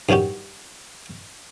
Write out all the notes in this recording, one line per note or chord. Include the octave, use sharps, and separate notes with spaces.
G2 D#3 C#4 F#4 G4